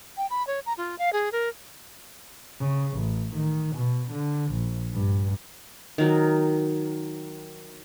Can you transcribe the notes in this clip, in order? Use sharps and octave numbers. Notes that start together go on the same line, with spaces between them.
G5
B5
C#5
A#5
F4
F5
G#4
A#4
C#3
A1
D#3
B2
D3
A#1
G2
D#3 F#3